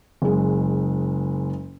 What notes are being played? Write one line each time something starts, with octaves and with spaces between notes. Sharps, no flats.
F#1 G#3